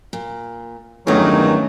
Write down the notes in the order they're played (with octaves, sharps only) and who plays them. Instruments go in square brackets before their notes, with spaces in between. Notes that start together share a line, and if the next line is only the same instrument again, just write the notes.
[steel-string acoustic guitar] A#2
[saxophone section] E2 G2 D#3 [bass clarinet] F#3 [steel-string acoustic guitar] A3 C#4